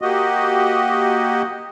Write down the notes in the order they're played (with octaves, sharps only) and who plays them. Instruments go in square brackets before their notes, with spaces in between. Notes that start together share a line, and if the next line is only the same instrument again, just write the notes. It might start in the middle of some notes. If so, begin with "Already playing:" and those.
[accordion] A#3 F#4 G4 D#5